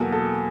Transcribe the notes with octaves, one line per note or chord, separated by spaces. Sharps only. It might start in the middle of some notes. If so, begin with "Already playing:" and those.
Already playing: E2 B2 F#3 A#3 A4
A4